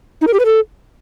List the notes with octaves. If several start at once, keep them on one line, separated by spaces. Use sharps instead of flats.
D#4
A#4
G4
B4
A4